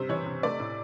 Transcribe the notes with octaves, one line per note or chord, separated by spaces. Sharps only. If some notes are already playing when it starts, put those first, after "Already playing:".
Already playing: C3 G3 C5
E3 C#5
C3
A3 D5
A2